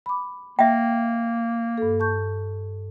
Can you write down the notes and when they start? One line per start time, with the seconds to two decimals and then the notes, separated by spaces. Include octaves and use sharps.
0.06 B5 D6
0.59 A#3 E5 G5
1.78 G2 A4
2.00 A5 C#6 G6